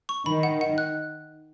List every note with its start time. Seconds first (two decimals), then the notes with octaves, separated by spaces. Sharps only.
0.09 C#6
0.26 D#3 B5
0.43 F#5
0.61 F#5
0.78 F#6